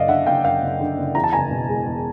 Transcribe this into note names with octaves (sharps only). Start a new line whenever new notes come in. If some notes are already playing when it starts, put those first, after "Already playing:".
Already playing: F#1 F#2 D5 D#5 F5
D3 E5 F#5
F#1 F5 G5
F#2 F5 G5
F#1
D3
F#1
E2 A#5
A5
F#1 G#5 A#5
B2
G#3
E2